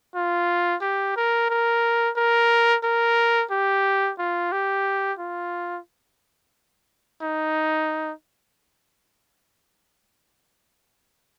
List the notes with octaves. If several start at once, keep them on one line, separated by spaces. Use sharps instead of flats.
F4
G4
A#4
A#4
A#4
A#4
G4
F4
G4
F4
D#4